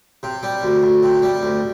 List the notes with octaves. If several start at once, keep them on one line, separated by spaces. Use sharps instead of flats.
C3
G3
D2
D2
C3
G3
D2